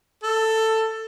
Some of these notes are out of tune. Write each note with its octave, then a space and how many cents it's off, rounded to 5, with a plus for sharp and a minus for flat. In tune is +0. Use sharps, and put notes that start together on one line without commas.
A4 +10